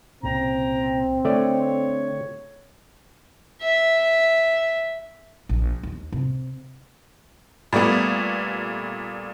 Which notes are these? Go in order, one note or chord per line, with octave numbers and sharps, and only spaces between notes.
C2 A#2 C#3 C4 G5 A#5
D3 A3 C#5 D5
E5
A#1
D#2
C3
A#2 G3 A3 B3